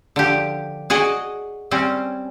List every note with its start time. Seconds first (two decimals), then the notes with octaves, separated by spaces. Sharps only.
0.16 D3 F3 G4
0.90 F#4 G#4 D5 D#5
1.71 G3 C4 C#4